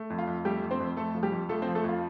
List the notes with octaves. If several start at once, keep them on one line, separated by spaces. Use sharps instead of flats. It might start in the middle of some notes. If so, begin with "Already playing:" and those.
Already playing: A3
F2
F4
F2
G3 A3 G4
F2
C4 C5
F2
F2 A3 A4
F3
G3 G4
F2
F3 A3 A4
C4 C5
F3
A3 A4
F2 F4